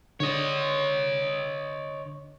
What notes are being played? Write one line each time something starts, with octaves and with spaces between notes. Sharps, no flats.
D3 D4 C#5 D#5